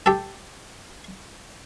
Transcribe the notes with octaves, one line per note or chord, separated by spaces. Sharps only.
G4 A4